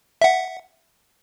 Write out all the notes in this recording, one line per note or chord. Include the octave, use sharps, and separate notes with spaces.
E5 F#5